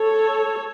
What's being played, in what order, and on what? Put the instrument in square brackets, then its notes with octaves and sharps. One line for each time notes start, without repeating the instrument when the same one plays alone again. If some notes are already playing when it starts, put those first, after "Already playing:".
Already playing: [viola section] A4 C#5